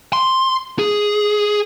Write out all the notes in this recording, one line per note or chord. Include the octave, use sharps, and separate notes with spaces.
C6
G#4